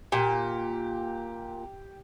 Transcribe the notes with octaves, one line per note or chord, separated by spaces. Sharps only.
A#2 G4